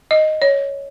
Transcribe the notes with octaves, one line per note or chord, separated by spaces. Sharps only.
D#5
C#5